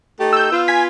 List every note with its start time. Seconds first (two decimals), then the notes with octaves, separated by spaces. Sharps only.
0.20 A3 D#4 G4
0.33 E6 G6
0.51 B3 F4
0.68 G#5 G#6 B6